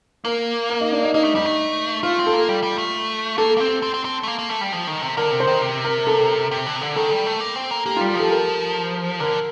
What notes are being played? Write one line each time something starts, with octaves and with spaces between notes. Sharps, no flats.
A#3 A#4
A#4
D#4
D4
D#4
A#3 D#4
A3
G3 D#4
A3
A3 F4
C4
A4
A#3
G3
G3
A3
A#3 A4
A#3
C4
C4
C4
C4
A3
A#3
A#3
A3
G3
F3
D#3
C3
D3 A#4
C3
C5
D#3
C3
A#4
A4
C3
D3
C3
D3
D#3 A4
G3
A3
A#3
C4
A#3
A#3 G4
F4
G3
G4
F3 A4
A#4
D3 A#4